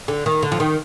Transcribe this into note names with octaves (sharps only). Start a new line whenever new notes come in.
D3
D#3
D3
F3
D#3